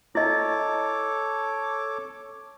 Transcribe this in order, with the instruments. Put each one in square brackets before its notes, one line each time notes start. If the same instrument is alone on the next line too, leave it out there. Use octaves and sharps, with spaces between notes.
[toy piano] E4 D#5 [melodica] A4 C#5 D6